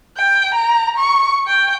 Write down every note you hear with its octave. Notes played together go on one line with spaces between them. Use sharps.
G5
A#5
C#6
G5